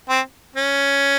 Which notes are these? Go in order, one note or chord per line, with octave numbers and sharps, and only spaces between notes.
C4
C#4